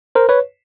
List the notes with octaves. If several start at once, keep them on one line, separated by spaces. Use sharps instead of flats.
A#4 C5
B4 C#5